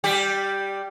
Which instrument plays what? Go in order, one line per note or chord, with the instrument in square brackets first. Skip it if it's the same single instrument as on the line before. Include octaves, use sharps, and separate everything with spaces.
[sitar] G3 G4